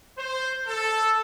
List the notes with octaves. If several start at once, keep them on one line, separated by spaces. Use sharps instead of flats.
C5
A4